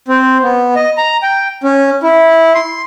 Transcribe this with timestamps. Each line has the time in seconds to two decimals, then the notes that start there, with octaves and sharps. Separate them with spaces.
0.08 C4
0.43 B3
0.76 D#5
0.98 A#5
1.22 G5
1.63 C#4
2.03 E4
2.55 C6